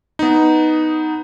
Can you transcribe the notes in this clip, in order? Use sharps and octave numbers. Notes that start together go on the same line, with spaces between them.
B3 D#4